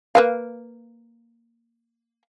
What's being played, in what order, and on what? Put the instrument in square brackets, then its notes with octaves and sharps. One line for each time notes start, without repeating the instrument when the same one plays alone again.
[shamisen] A#3 B4 F5